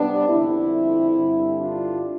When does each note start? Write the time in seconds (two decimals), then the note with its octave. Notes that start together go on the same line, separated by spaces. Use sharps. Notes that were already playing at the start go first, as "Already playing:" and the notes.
Already playing: C3 G3 B3 D4
0.28 F2 D3 G3 C4 E4
1.15 G2 D3 G3
1.59 D4 F4